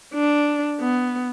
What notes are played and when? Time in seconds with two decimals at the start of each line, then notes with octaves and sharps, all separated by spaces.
0.14 D4
0.81 B3